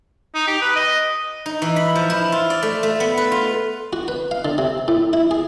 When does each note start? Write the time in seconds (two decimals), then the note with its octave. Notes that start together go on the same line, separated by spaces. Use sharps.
0.35 D#4
0.47 G4
0.62 B4
0.76 D#5
1.46 D#4
1.62 E3
1.76 B5
1.95 F3
2.10 E4
2.32 F4
2.50 D5
2.63 A3
2.83 A3
3.00 B3
3.17 B4
3.32 F4
3.93 F#4
4.08 B4
4.31 F5
4.45 D3
4.58 C3
4.88 A2
5.13 E4
5.31 G#4